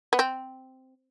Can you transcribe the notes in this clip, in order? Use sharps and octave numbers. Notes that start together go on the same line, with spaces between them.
B3
C4